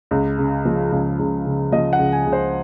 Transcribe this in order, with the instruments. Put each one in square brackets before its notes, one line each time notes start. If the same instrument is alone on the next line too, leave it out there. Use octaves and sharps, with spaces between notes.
[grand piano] C#2
C#3
F3
C#2
C#2
C#3
F3 D#5
F#5
C#2
G#5
C#2
C5